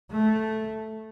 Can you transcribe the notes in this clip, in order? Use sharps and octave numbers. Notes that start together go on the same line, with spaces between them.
A3